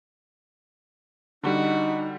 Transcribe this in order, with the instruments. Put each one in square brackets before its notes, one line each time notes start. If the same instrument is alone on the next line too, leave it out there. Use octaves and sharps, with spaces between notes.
[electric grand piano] D3 G3 [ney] D#4 [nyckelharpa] F#4